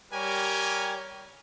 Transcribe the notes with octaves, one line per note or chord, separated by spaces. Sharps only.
G3 G4 A#4 C#5 G#5